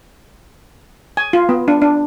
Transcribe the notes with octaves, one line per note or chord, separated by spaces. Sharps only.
G#5
F4
B3
D4
D4